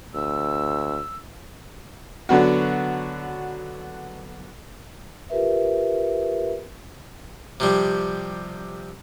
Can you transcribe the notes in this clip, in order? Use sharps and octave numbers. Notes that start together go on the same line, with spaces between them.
D2 E6
D3 F#3 B3 F#4
F4 G4 A#4 B4 E5
C3 F3 G3